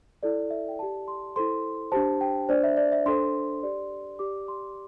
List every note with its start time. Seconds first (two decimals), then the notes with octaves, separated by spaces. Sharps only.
0.23 E4 A4 D5
0.50 E5
0.68 G5
0.78 G4 D5 A5
1.08 C6
1.36 E4 A4 C5 C6
1.92 D4 G4 C5 A5
2.21 G5
2.49 D4 C5 D5
2.64 E5
2.77 D5
2.92 E5
3.06 D4 A4 C5 C6
3.63 G4 D5
4.19 G4 D5 D6
4.48 C6